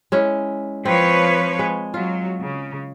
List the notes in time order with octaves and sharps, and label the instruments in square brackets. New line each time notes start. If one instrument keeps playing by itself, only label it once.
[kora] G#3 C#4 E4
[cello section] F3 B4 C#5 [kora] C4
[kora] G#3
[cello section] F#3 [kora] F4
[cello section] C#3